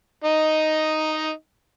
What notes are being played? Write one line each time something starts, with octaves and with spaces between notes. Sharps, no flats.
D#4 D#5